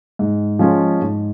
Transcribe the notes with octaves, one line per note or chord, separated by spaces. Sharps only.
G#2
F3 G#3 C#4 F4
G#2